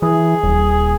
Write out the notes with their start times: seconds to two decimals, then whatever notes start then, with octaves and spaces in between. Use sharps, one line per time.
0.02 E3 G#4
0.43 D#1